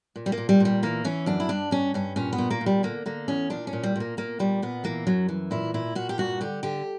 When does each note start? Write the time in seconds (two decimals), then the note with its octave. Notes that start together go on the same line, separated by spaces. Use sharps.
0.16 A#2
0.26 G3
0.32 A#3
0.38 A#2
0.49 G3
0.60 A#2 G3
0.83 E3 A#3
1.04 E3 C#4
1.26 F#2 D4
1.40 E4
1.49 G2 D4
1.71 G2 C#4
1.94 G2 C#4
2.16 A#2 C#4
2.33 B3
2.38 A#2
2.51 A#3
2.61 A#2
2.66 G3
2.83 D3 A#3
3.06 D3 A#3
3.28 E2 C#4
3.50 A#2 D4
3.67 C#4
3.73 A#2
3.83 G3
3.96 A#2 A#3
4.17 A#2 A#3
4.39 A#2 G3
4.62 A#2 B3
4.84 E3 A#3
5.07 F#2 F#3
5.28 E3
5.51 A#2 E4
5.74 A#2 E4
5.95 A#2 F#4
6.09 G4
6.18 G2 F#4
6.41 D3 G4
6.63 D3 G4